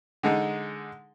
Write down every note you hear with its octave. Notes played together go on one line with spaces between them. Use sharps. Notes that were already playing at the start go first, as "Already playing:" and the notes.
D3 G#3 D#4